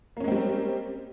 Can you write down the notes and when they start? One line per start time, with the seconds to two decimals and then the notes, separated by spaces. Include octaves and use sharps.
0.17 A#3
0.20 C#4
0.24 G#3
0.28 C4
0.32 G3